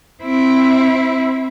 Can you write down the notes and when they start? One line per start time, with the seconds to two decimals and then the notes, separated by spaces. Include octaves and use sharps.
0.23 C4 E4